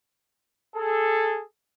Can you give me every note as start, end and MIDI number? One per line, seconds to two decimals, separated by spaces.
0.75 1.42 68
0.75 1.42 69